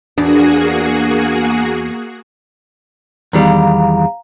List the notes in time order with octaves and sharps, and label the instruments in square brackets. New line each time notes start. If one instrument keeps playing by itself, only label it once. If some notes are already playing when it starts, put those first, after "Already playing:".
[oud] E2 D4 [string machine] A#3 F#4 G#4
[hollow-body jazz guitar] E2 D#3 G3 [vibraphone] F5 A#5